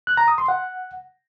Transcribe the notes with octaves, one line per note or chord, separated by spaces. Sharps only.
F#6
A#5
D#6
C6
F#5